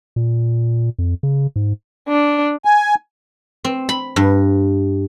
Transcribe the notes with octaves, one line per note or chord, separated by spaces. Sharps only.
A#2
F2
C#3
G#2
D4
G#5
C4
B5
G2